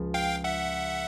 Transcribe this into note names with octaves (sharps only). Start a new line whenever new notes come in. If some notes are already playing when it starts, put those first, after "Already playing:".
Already playing: C#2 C#3 F3
F5 G5
E5 F#5